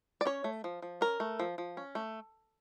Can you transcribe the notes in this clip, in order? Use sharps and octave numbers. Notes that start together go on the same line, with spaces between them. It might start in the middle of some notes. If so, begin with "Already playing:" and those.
D5
C#4 C#5
A3
F3
F3
C#4 A#4
A3
F3
F3
C#4
A3